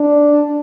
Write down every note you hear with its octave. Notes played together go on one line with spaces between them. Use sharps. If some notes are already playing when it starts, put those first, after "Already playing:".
Already playing: D4